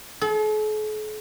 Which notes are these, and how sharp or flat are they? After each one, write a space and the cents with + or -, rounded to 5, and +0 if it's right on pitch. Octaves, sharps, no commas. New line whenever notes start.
A4 -45